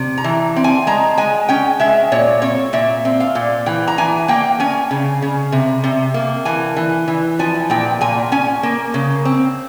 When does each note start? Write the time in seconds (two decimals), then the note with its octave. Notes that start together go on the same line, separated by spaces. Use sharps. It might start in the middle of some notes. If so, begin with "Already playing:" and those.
Already playing: C3
0.18 A#5
0.24 E3
0.56 C4
0.64 G#5
0.87 G#3 A#5
1.18 G#3 G#5
1.49 C#4 G5
1.80 G#3 E5
2.12 A#2 C#5
2.42 C4 C#5
2.73 A#2 E5
3.05 C4
3.20 F5
3.35 A#2
3.66 E3 G5
3.88 A#5
3.98 E3 G#5
4.28 A#3 G5
4.60 C#4 G#5
4.91 C#3
5.22 C#3
5.52 C3
5.84 C3
6.14 A#3
6.45 E3 G#5
6.76 E3
7.08 E3
7.39 F3 G#5
7.70 A#2 G5
8.01 A#2 G#5
8.32 C#4 G#5
8.63 A#3
8.94 C#3
9.25 C4